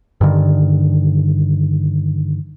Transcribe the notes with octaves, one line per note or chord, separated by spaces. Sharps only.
G2 D3 D#3